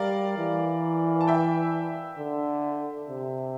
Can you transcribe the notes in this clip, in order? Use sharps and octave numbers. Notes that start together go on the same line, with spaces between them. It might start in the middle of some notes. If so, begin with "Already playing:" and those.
Already playing: G3 A#4 D5 F5
E3
A5
E5 G5
D3
C3